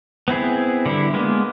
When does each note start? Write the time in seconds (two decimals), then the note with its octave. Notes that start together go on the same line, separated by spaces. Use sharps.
0.28 B3 C4 E4 G#4
0.86 D3 G3 E4
1.14 G#3 A#3 B3